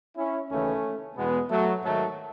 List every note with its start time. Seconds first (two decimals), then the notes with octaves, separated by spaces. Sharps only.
0.16 C#4 E4
0.49 D#2 C#3 E3 A3 C#4
1.15 E2 B2 G#3 B3
1.49 F#3 A3
1.82 G#2 D#3 F#3 A3